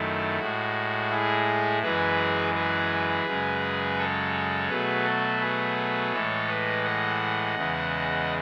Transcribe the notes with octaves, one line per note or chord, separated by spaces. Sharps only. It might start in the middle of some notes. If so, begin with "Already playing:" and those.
Already playing: F#2 D#3 F#3 A3 E4
A2 G#3 F#4
E4 G#4
F#2 E3 G#3 G#4 B4
G#4 B4
F#2 C#3 G#3
A4 C#5
B2 F#3 A3 G#4 B4
F#4 A4
G#4 B4
A2 E3 G#3 A4 C#5
B4 D#5
D#5 F#5
E2 C#3 E3 G#3